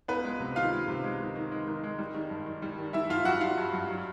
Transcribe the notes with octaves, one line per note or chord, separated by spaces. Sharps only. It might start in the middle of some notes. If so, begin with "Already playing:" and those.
C#2 B3 B4
G#3
C3
D#3 F4 F5
G#3
C3
G#3
D#3
D#3
G#3
D#3
G#3
G3
D#3
G2
D#3
G3
D#3
G3 E4 E5
G2 F4 F5
G2 F#4 F#5
G2 F4 F5
G2
G2
F#3